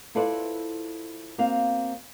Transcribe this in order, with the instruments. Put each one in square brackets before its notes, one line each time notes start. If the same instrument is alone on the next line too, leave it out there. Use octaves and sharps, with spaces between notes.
[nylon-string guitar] E4 F4 A4 B4 C5 D5
A#3 C4 F#4 F5